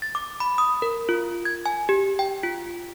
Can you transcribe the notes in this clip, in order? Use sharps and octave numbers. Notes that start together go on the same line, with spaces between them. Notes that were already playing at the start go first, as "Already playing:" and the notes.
A6
D6
B5
D#6
A#4
F4
G#6
G#5
G4
G5
F4